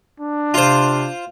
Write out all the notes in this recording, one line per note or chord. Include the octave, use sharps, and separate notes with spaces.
D4
C3 F4 C5